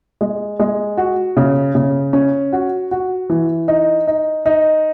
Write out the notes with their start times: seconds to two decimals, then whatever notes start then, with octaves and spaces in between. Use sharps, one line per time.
0.21 G#3
0.60 G#3
0.97 F#4
1.37 C#3
1.75 C#3
2.13 C#4
2.53 F#4
2.91 F#4
3.30 E3
3.68 D#4
4.07 D#4
4.46 D#4